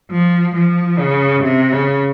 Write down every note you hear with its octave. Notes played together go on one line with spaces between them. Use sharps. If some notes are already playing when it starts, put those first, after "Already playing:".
F3
F3
C#3
C3
C#3